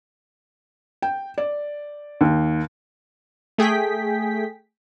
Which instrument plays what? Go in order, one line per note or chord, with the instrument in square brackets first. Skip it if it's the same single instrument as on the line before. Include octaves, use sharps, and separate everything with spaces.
[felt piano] G5
D5
D#2
[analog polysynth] A3 G#4 G5 B6